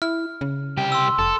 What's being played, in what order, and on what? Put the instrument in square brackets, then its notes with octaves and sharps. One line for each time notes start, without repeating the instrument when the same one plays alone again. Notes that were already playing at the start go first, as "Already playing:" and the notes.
[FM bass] E4 [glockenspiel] F6
[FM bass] C#3
[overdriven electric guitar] C2 G4
[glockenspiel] C6 E6
[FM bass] F1 [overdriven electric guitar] A4